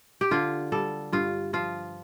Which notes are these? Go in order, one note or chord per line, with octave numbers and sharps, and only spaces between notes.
G4
D3 F4
G3 A4
G2 F4
F3 F4